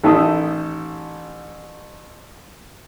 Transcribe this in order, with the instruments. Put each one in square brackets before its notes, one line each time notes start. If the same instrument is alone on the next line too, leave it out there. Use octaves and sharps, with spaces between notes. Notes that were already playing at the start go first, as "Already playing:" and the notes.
[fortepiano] A1 D#3 A4 E5 D#6